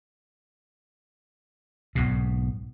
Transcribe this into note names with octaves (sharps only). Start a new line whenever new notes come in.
B1 G#2 B2